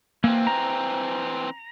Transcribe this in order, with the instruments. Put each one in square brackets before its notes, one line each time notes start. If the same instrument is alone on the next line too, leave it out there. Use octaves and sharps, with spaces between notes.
[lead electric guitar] E3 C4 [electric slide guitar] A#3
[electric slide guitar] A#5